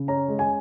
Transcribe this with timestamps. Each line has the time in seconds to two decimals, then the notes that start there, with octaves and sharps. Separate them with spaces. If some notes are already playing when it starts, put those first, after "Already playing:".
Already playing: C#3
0.08 C#4 A#5
0.28 G#3
0.39 G#5